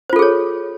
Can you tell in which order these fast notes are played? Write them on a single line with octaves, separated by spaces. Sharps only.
C5 F4 A4 G#4 C#5